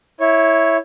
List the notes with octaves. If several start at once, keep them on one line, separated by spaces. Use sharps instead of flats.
E4 C#5